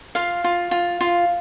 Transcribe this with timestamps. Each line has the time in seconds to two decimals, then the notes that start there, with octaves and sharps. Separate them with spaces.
0.15 F4 F5
0.44 F4
0.71 F4
1.01 F4